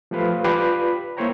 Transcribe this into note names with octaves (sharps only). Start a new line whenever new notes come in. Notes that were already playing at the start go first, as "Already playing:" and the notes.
F3 A3 G4 B4 C5 F5
F4 G4 B4 D5
A#3 E4 C5 C#5 G5 A#5